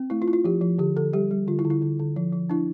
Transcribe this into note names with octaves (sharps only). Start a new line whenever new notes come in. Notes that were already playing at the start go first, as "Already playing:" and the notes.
Already playing: C4
A3 E4
F4
E4
F4
F3 G4
F3
D3 G4
D3 A4
G3 G4
G3
D3 F4
E4
D3
E4
D3
D3
F3
F3
D4 E4